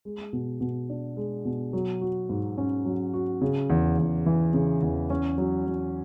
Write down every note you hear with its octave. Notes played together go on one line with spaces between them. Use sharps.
G#3
B2
B2
D4
G#3
B2
F#3
F#4
G#2
C#4
F#3
F#4
C#3
E2
E2
E3
C#3
E2
C#4
F#3
F#3